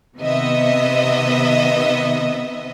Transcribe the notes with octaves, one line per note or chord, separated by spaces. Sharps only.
C3 D#3 B3 D#5 E5